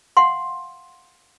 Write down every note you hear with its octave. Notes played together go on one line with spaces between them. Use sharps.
F5 F#5 C6